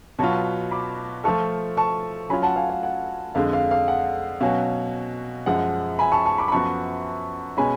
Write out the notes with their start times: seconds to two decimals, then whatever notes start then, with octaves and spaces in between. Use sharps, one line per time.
0.19 B2 F#3 B3 F4 A5 C#6
0.71 B5 D6
1.24 F3 A3 F4 A4 A5 C#6
1.77 A5 C#6
2.29 F#3 C#4 F4 G#5 B5
2.43 F#5 A5
2.56 F5 G#5
2.69 F5
2.83 F#5
3.35 F2 D3 G#3 F5
3.53 F5
3.71 F5
3.88 F#5
4.41 B2 F#3 C#4 F#4 F5 G#5
5.46 F#2 F3 G#3 F#5
5.99 G#5 B5
6.12 A5 C#6
6.26 A5 C#6
6.38 B5 D6
6.48 B5
6.52 F#2 F3 B3 F#4 A5 C#6
7.57 B2 G#3 C#4 G#5 B5